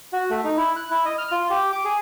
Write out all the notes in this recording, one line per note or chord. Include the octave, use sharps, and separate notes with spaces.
F#4
A3
D#4
E4
F#6
E4
D#5
F6
F4
G4
D6
G#4